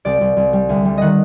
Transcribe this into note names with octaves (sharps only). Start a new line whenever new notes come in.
C2 D5
C2
C2
G3
D2
G3
D#3 D#5 F#5